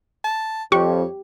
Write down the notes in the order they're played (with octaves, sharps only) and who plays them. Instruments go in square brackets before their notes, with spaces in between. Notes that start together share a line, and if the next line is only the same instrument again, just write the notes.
[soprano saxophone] A5
[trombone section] F2 [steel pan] G4 [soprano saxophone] C#5 [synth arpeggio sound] C#6